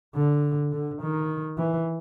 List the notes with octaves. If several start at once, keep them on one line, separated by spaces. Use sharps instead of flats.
D3
D3
D#3
E3